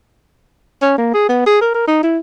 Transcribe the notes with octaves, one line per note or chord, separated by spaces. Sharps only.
C#4
A#3
G#4
B3
G#4
A#4
A#4
D#4
E4